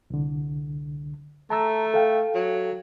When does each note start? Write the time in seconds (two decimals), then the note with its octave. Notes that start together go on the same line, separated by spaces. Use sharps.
0.10 C2 D3
1.50 A3 A5 A#5 E6
1.94 A4 F5 G5
2.35 F#3